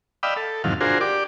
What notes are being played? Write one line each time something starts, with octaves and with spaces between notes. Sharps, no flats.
D5 D#5 F5 G5 B5 E6
A4
E2 G#2 C3 D#3 F#3 F5
D4 F4 F#4 G#4 A#4 C5
G4 D5 D6